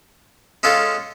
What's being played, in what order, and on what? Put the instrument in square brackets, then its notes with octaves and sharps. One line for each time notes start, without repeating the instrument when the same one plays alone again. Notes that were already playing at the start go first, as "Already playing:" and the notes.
[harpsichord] G#3 C#4 F4 A4